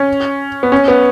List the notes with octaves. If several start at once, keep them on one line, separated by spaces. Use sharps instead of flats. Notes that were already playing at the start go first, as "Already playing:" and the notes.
Already playing: C#4
B3
C#4
B3